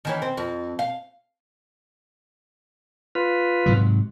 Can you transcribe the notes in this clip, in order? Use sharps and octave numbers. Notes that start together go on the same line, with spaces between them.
D#3 E3 C#4
C4
F2
F5
F4 B4
G#2 C3 F#3